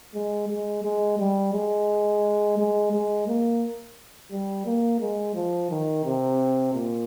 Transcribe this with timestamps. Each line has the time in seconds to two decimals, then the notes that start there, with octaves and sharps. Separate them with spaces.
0.14 G#3
0.49 G#3
0.83 G#3
1.19 G3
1.53 G#3
2.58 G#3
2.93 G#3
3.28 A#3
4.32 G3
4.66 A#3
5.00 G#3
5.35 F3
5.70 D#3
6.05 C3
6.75 A#2